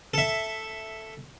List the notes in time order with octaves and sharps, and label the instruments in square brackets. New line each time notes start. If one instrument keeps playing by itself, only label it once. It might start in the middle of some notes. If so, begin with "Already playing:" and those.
[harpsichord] A4 E5